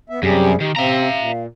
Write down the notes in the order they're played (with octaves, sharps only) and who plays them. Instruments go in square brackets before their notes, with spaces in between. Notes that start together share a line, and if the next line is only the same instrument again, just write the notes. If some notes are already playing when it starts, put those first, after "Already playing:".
[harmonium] B3 E5
[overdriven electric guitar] F#2 [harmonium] C3 G3 G#4 [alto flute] G4
[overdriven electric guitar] D#3 [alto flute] G4
[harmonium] C3 C4 [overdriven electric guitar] E5 A#5 [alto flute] F5
[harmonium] A#2